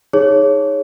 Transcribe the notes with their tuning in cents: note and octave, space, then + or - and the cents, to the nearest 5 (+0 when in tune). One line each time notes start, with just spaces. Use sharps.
D#4 +15 G#4 +0 C#5 +0